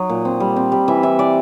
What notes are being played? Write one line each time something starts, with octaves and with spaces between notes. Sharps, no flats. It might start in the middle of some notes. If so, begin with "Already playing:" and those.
Already playing: F#3 D#4 D#5
A#2
C4
G3
C4
G3
E3 E5
E3 E5
E3 D5